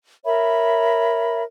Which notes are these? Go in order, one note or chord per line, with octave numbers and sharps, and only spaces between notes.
A#4 C#5 E5 B5